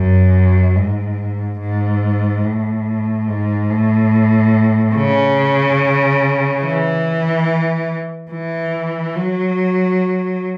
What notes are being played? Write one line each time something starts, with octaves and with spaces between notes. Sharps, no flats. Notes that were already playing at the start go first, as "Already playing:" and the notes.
Already playing: F#2
G#2
G#2
A2
G#2
A2
C#3
E3
E3
F#3